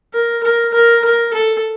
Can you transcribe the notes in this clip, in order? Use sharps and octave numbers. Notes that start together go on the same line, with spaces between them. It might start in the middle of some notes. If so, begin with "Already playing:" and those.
A#4
A#4
A#4
A#4
A4